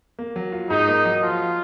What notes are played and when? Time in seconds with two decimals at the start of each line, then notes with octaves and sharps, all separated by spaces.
0.19 A#3
0.36 F#3
0.52 F4
0.70 G#2 D#4
0.88 A#3
1.05 F#3
1.23 F3 F4